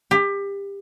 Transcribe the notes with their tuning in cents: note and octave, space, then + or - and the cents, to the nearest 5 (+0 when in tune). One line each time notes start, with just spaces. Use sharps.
G4 +25